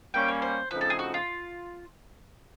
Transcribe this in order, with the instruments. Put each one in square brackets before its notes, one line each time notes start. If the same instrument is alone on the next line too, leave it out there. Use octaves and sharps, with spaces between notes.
[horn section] G3 A#3 C#4 [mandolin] G5
[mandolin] C#5
C5
[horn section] C#3 F3 A3 C4 D#4 [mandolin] B4
[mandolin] A4
G#4
F#4
F4